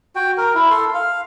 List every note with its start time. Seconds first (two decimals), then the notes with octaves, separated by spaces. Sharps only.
0.16 F#4 G5
0.38 A#4
0.55 E4
0.71 A4 C6
0.94 F5